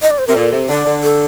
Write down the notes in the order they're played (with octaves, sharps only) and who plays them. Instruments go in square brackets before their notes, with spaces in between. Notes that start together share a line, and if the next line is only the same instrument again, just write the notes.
[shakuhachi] D#5
D5
C5
[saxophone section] C3 [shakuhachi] A#4
[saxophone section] A#2 [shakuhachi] A4
[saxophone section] C3
[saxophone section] D3 [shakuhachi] D5
[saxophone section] D3
[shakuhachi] A4